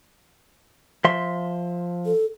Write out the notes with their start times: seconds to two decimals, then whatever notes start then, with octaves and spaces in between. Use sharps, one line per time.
1.04 F3 E5 C6
2.06 A4